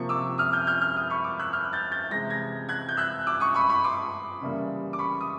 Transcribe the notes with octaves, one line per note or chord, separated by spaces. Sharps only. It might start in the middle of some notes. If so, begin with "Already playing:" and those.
Already playing: C3 F3 A#3 C#6
D6 E6
D#6 F6
F6 G6
F6 G6
F6 G6
D#6 F6
B5 C#6
D6 E6
E6 F#6
F6 G6
G6 A6
G6 A6
C3 E3 G#3 A#6
G#6 A#6
F#6 G#6
G6
E6 F#6
D6 E6
C#6 D#6
B5 C#6
B5 C#6
C6 D6
C#3 E3 G3 A#3
D6
B5 C#6
D#6